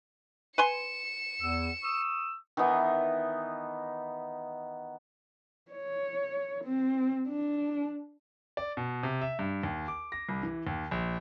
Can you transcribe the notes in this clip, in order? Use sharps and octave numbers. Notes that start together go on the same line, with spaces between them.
B4 G#5 C6 C#7 E7
E2 E6
C#6 D#6 E6
D#3 E3 B3 D#4
C#5
C4
D4
D5
B2
C3
E5
G2
D#2
D6
A#6
C2
E3
D#2
A#1